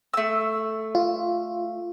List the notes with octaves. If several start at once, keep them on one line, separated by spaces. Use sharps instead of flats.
A3 E6
F4